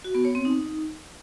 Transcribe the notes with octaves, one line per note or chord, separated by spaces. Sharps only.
F#4
B3
C#5
C4
D#4